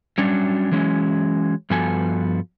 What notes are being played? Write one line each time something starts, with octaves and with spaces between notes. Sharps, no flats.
F#3 G3 C#4 D4 F#4
E3 F#3 G#3 C#4
G2 F3 B3 F#4 A4 G#5